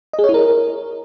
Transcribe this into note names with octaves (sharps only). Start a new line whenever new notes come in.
D#5
G#4
C#5
E4
A#4